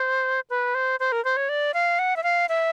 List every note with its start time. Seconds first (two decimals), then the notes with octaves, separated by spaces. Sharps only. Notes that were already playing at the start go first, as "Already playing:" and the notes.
Already playing: C5
0.50 B4
0.75 C5
1.00 C5
1.12 A#4
1.25 C5
1.37 C#5
1.49 D5
1.74 F5
1.99 F#5
2.16 E5
2.23 F5
2.49 E5